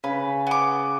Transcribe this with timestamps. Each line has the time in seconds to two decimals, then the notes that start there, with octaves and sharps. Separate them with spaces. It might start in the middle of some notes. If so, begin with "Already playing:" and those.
0.04 C#3 B4
0.47 B3 D6